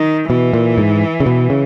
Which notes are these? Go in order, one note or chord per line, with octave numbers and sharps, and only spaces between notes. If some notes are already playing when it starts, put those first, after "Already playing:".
Already playing: D#3
B2 E3
A#2
G#2
C#3
B2
C#3